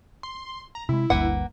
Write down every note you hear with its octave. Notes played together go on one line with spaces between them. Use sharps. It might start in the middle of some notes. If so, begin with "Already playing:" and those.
C6
A#5
C3 G#3 E4
G1 D2 G2 A#3 B4 F#5